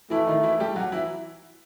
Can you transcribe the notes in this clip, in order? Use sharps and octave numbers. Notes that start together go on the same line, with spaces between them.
E3 A3 E4
D#3 D#4
E3 E4
G3 G4
F#3 F#4
E3 E4